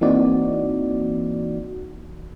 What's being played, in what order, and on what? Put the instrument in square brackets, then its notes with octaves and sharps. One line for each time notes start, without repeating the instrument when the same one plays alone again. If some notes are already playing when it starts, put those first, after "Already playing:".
[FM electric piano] E3 A#3 C4 D#4 F#4 D5